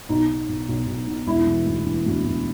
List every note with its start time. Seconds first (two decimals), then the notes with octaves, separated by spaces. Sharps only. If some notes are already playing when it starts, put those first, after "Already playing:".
0.09 B1 D#4
0.28 B2
0.49 B1
0.69 B1
0.87 B1
1.07 B2
1.27 E1 E4
1.47 E3
1.66 D2
1.86 E3
2.06 D2
2.26 D2